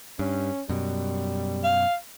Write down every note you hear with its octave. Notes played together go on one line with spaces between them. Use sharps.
G2 C#4
F#2 B2 G3
F5